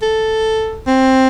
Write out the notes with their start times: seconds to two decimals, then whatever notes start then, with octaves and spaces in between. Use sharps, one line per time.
0.02 A4
0.87 C4